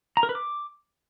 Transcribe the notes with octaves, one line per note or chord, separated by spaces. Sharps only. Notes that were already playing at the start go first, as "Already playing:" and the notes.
A#5
A#4
B4
D6